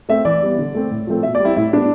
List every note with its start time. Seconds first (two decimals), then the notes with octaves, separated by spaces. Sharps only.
0.09 A3 C4 E5
0.25 E3 D5
0.42 G3 B3
0.58 D3
0.75 A3 C4
0.91 A2
1.07 F3 A3 C4
1.23 B2 E5
1.35 D5
1.39 G3
1.44 C4 E4
1.56 A2 E4
1.72 G3 B3 D4